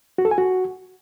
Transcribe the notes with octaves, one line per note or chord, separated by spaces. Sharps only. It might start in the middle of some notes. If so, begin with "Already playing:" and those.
F#4
A4
G#5
F#4